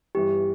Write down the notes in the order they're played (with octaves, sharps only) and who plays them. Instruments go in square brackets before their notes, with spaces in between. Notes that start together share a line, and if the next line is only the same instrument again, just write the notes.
[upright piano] G1 G2 E3 G3 [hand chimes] G4